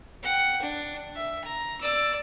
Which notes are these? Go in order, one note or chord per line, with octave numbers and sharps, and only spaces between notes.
F#5 G5
D4
E5
A#5
D5 E6